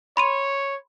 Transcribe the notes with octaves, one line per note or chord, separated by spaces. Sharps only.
C#5 B5 C6 D#7